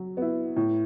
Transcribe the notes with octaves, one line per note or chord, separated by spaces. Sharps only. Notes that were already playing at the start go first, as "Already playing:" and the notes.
Already playing: F#3
B3 E4
A2